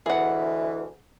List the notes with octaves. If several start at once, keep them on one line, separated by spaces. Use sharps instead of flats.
D2 B2 E3 G#4 F#5